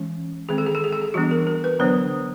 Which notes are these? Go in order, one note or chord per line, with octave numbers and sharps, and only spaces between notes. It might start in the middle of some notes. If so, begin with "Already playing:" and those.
Already playing: E3 G#3 C#4
D#3 G#3 C4 G#4
A4
G#4
A4
G#4
A4
G#4
E3 G3 B3 D4 F#4
A#4
A#4
B4
D3 F#3 B3 D4 C5